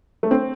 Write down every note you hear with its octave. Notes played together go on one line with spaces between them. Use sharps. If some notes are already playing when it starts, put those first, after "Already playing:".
A3
C4